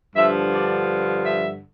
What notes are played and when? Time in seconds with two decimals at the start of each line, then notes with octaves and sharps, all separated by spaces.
0.16 G2 D3 F3 E5
0.52 D5
1.25 E5